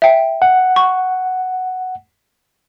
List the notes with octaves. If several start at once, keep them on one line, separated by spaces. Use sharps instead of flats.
E5 G5
F#5
C#6